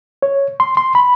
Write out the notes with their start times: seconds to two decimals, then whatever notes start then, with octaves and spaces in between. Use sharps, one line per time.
0.22 C#5
0.60 C6
0.77 C6
0.95 B5